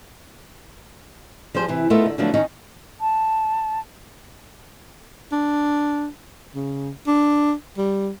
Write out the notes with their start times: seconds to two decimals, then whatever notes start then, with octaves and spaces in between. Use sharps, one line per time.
1.54 F3 G3 G#4 C5
1.68 C3 E3
1.90 A3 B3 D#4 F4 A4 A#4
2.06 D3
2.18 D3 F3 F#3 A3 B3 D4
2.34 D#3 C#4 D#4
3.00 A5
5.32 D4
6.55 C#3
7.07 D4
7.77 G3